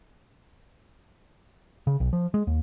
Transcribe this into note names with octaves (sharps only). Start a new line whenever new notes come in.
C#3
B1
F3
G#3
D#2